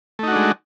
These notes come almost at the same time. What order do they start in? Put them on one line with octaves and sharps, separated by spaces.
A3 D#4 F#4 D4 G#3